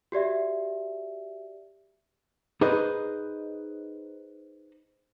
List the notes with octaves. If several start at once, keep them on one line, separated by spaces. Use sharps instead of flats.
F#4 G4 D5 E5
D#4 G#4 B4 C5 D#5